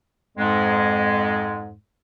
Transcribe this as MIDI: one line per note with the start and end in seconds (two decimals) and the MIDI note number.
0.38 1.74 41
0.38 1.74 44
0.38 1.74 56